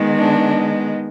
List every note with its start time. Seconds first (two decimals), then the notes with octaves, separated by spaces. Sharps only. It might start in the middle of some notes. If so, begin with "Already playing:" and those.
Already playing: D#3 G#3 B3
0.17 D4